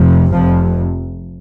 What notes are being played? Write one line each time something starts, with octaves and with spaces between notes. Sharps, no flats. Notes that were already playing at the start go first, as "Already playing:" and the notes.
Already playing: F1 F2 C3
F1 F2 C3 F3